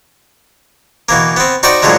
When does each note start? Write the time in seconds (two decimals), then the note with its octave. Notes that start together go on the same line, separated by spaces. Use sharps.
1.09 B2 E3 A#3
1.37 B3 C4
1.63 D#4 F#4 C5 D5 F#5 G5
1.82 A2 D3 D#3 F3 F#3 G#3